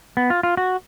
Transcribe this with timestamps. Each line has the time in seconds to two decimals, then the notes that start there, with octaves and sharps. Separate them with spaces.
0.17 B3
0.30 F4
0.43 F4
0.57 F#4